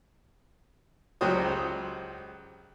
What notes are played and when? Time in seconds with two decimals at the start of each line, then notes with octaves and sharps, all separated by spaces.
1.21 C#2 F#3 F#4 G4 C5 D#6